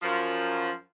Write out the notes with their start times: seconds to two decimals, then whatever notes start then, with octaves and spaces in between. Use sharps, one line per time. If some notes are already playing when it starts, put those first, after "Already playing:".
0.03 F#2 F3